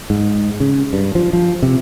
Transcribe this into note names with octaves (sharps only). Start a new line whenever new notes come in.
G#2
C#3
G2
F3
F3
C3